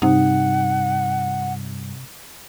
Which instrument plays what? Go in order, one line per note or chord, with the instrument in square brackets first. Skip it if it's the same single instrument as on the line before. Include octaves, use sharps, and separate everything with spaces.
[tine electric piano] G2 G3 [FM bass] C3 [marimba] D#4 [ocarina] F#5